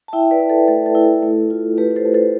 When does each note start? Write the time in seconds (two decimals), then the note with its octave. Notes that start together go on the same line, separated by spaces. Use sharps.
0.08 A5
0.13 E4 E5 G5
0.31 B4 D5
0.40 E4
0.50 A4
0.68 A3 A4
0.86 A4
0.95 E4
1.05 A4
1.23 A3
1.50 F4
1.78 A3 G4 B4
1.91 B4
1.96 A4 C5
2.05 A3
2.14 A4 C5